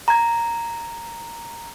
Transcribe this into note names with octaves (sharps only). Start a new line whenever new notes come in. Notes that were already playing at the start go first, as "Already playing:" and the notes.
A#5 G#6